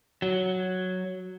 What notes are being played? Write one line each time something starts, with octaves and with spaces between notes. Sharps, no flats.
F#3